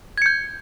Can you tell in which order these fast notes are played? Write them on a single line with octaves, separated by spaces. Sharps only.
G#6 C#7 G6